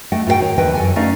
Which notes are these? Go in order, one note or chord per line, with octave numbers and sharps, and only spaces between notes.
A3 D#5 F#5 G5
G#2 F4 F#4 A#4 F#5 G5
D#3 C#5
D#2 D3 E3 B4 D#5 G5
F#2 A4 G#5
A3 C#4 D#4 D5 D#5 F5